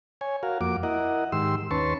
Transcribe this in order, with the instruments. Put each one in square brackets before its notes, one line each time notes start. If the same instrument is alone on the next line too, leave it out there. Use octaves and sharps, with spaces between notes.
[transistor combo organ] C#5 G#5
F#4 A#4 F5
F2 A#3 F#4 D6
E4 A#4 D#5 F#5
G#2 D#3 G4 C6 E6
D#2 C#4 B4 A5 C6 C#6